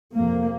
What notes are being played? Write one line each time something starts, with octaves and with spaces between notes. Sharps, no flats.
F2 C3 A#3